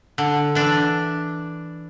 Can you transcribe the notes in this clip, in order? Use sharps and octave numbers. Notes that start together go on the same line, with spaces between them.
D3
E3 D4